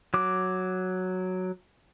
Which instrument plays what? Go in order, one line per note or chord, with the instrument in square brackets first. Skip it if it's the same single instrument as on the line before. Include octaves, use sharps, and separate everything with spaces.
[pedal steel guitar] F#3 D6